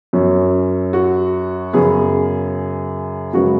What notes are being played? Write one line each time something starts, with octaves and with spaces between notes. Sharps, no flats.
F#2 F#3 C#4
F#4
F#2 C#3 B3 G#4
F#2 C#3 G#3 B3 F#4